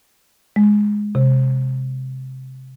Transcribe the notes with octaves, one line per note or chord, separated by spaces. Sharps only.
G#3
C3